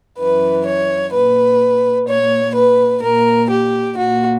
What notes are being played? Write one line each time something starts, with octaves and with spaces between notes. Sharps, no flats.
F#2 E3 B4
C#5
A#2 B4
A#2 C#5
B4
A#2 A#4
G4
A#2 F#4